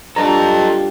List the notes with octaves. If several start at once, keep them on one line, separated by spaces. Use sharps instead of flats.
G2 F4 G4 A4 D#5 A5 A#5